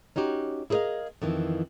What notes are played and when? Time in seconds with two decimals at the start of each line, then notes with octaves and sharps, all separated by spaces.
0.16 C#4 D#4 F#4 G4
0.70 E4 G#4 A#4 B4 D#5 F5
1.22 F2 D#3 E3